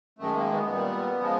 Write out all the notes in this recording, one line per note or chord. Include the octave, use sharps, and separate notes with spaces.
F#2 D#3 G#3 A3
A#3
B3
A#2 G3
C#3 F3 G#3